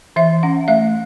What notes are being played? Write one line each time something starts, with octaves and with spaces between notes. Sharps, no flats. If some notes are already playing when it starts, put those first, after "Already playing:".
E3 E5
C#4 F#5
A3 E5